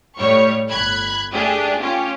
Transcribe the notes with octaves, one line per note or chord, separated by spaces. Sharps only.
A2 G3 C#5 C#6
G1 B5 F#6 G#6
A3 D4 G4 G#4
C#4 F4 G4